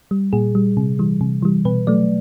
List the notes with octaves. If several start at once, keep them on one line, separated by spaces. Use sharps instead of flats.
G3
A#2 G#4
G3
C3
E3 G3
C3
E3 G3
B2 B4
F#3 A3 D5